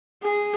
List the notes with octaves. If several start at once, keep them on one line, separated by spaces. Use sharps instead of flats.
G#4